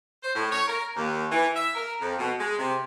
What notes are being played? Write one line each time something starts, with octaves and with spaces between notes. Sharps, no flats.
C5
A2
C#5
A#4
D#2
E3
E5
A#4
F2
B2
G#3
C3